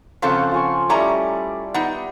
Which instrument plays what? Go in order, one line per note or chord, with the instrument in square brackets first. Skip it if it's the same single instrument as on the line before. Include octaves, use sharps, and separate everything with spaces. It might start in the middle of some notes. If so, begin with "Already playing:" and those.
[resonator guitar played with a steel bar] C#3 F3 A4 [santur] C4 C#4 F#5
[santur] F4 G#5 C#6
[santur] G3 E4 D5 [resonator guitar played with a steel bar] A3 C#4 A#5
[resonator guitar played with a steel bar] B3 D#4